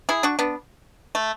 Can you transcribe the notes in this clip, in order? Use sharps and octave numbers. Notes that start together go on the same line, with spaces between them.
E4 G#4
D4 F#4
B3 D4
A3